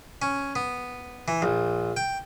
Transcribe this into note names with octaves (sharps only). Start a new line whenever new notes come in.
C#4
B3
E3
A#1
G5